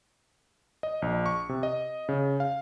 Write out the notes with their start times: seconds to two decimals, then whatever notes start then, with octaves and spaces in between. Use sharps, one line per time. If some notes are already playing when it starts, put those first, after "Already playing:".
0.83 D#5
1.02 A#1
1.26 C#6
1.49 C3
1.63 D#5
2.09 C#3
2.40 F5